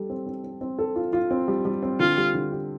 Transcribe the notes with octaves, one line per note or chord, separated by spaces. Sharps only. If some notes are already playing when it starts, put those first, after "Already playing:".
Already playing: G3 A4
C4
C4
C4
C4
A4
F4
F4
C4
G3
G3
C4
D3 F4
G3
D3
G4